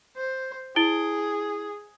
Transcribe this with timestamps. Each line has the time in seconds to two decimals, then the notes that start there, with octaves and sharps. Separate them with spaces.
0.16 C5
0.76 E4 G#4 D7 G7